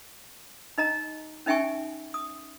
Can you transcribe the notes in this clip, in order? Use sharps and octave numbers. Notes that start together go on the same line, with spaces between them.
D#4 D#5 A#5
C#4 D#4 E5 G5 G#5 C#6
D#6